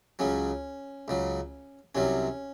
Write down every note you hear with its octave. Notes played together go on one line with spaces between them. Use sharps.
C#2 C#3 F#3 C#4
C#2 C#3 F#3
C2 C3 F#3 C#4